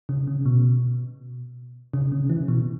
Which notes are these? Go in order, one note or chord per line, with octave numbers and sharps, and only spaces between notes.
C#3
C#3
B2
C#3
C#3
E3
B2